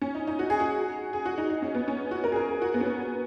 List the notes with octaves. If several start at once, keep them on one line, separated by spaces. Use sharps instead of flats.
C#4
D#4
D#4
F#4
G#4
F#4
G#4
F#4
D#4
D#4
C#4
B3
C#4
F#4
A#4
G#4
A#4
G#4
F#4
B3
C#4
B3